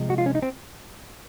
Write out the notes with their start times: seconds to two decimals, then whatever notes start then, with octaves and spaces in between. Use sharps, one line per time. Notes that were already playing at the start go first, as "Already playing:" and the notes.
Already playing: C3 F3 G#3
0.10 F#4
0.18 F4
0.26 C#4
0.35 D#4
0.42 C4